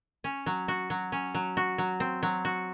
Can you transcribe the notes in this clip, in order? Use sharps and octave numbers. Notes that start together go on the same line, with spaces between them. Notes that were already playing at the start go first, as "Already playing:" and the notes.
C#4
F#3
F#4
F#3
C#4
F#3
F#4
F#3
C4
F#3
F#4